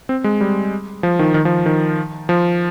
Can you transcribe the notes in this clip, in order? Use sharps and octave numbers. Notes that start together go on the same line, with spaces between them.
C4
G#3
G3
F3
D#3
D#3
F3
D#3
F3